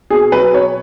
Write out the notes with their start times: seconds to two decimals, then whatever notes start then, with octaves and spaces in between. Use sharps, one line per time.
0.10 B2 G#4
0.32 F#3 B4
0.54 B2 C#5